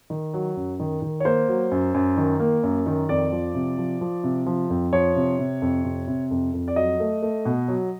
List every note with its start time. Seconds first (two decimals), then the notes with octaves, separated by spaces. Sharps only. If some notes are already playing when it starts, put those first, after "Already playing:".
0.10 D#3
0.34 F#3
0.56 F#2
0.80 D#3
1.02 D#3
1.20 C#5
1.25 A#3 C5
1.48 F#3
1.71 F#2
1.94 F#2
2.17 D#3
2.40 A#3
2.63 F#2
2.86 D#3
3.09 F2 D5
3.32 F3
3.55 C3
3.78 F3
4.01 F3
4.24 C3
4.46 F3
4.70 F2
4.93 F3 C#5
5.16 C3
5.39 C3
5.62 F2
5.84 C3
6.08 C3
6.31 F2
6.54 F2
6.68 D5
6.76 F#3 D#5
7.00 A3
7.22 A3
7.45 B2
7.68 F#3